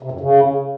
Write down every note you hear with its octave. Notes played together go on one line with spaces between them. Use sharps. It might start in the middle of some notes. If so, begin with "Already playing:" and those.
C3
F#2
C#3